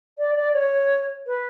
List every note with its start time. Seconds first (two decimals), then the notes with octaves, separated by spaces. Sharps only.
0.18 D5
0.36 D5
0.54 C#5
1.27 B4